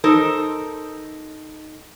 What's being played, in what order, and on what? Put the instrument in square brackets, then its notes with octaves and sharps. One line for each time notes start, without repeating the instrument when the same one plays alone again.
[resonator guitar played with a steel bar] D#4 A4 A#4 C5